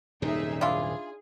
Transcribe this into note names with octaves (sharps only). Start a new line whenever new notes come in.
D#1 F#2 C3 D#4 G#4 E5
D4 E4 F4 G#4